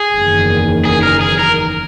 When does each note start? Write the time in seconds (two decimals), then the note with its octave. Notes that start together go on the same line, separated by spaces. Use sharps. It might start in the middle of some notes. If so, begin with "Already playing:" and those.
Already playing: G#4
0.13 F#1 E2 D#3
0.85 G#4
1.03 A#4
1.21 G#4
1.39 A#4